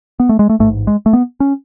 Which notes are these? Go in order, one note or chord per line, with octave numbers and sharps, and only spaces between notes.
B3
A3
G#3
A3
A1 G#2 A3
G#3
A3
B3
C#4